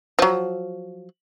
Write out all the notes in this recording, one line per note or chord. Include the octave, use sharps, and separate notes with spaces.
F3 F#3